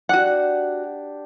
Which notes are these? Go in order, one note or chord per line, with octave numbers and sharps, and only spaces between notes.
D4 F#4 G4 F#5